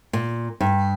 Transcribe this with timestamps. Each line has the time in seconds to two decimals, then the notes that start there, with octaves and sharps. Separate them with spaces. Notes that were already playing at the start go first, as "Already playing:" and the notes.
0.13 A#2
0.60 G2